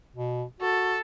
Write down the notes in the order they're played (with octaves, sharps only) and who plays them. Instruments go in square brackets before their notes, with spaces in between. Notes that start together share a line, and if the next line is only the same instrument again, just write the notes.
[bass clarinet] B2
[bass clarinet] F#4 [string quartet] A4